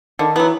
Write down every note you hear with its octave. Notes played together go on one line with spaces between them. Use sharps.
D3 D#3
E3 F#3 B3